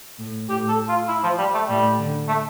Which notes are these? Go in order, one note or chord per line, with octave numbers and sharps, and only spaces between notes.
A2
A2 G4
A4
F4
E4
F3
G3
A3
A2 G3
D3
A3